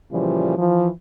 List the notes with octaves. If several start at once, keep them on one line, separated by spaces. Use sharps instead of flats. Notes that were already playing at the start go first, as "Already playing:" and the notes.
A#2 C#3 E3 F3 G3
E3 F3